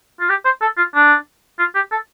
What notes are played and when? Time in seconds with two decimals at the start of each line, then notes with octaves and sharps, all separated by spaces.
0.20 F4
0.29 G4
0.45 C5
0.61 A4
0.77 F4
0.94 D4
1.59 F4
1.75 G4
1.92 A4